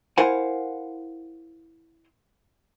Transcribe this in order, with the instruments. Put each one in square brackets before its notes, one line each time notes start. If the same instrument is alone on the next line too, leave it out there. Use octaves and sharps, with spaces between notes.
[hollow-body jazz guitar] E4 A#4 C5 F5 F#5 G#5